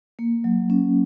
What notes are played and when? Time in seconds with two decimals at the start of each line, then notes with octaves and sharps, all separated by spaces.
0.19 A#3
0.44 F#3
0.70 C#4